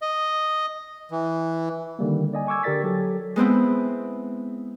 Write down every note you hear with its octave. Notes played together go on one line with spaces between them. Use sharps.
D#5
E3
D3 D#3 G3 A#3
D5 D#5 G#5
G#5 C#6 D6 E6 G#6
D3 G4 A#4 D5 A6 B6
F#3 G4 A4
G#3 B3 C4 E4